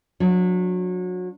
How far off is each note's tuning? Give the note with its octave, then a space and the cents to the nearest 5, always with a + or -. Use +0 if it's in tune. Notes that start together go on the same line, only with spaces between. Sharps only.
F#3 -30 D4 +0